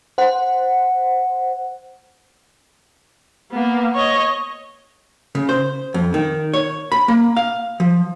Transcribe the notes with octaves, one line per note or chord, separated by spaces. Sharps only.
C5 F#5
A#3 B3
C#5 D#5
C#3
C5
F2
D#3
C#5
B5
A#3
F5
F3